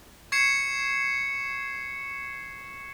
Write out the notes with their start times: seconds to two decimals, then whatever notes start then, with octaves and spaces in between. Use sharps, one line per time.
0.32 C#6 G#6 C7 C#7 E7